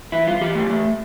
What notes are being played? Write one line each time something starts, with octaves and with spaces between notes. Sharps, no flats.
E3 E4
G2 F4
E3 G4
A3
A3